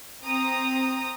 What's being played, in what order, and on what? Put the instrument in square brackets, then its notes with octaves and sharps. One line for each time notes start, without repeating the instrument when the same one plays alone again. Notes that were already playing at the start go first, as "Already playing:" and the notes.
[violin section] C4 A#5 D#6